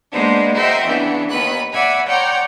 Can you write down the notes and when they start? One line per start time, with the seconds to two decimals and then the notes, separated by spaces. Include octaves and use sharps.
0.12 G#3 A#3 B3 D4 D#4 C5
0.54 F#4 A#4 C5 D#5 E5 G5
0.85 C#3 E3 B3 D4
1.29 D#2 B3 B4 B5 F#6
1.72 D5 E5 F#5 G#5 B5
2.06 C#5 D5 F#5 G5 A#5 C6